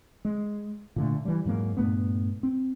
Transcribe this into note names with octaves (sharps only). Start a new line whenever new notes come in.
G#3
A#2 D3 A3
E3 G3
F2 G#2 F#3 A#3
G2 A#2 A3 B3
C4